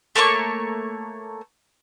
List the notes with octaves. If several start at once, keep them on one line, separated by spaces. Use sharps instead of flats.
A3 A#3 C#5 C#6